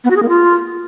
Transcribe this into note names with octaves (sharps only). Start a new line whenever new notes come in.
B3
F#4
G#4
A#3
F4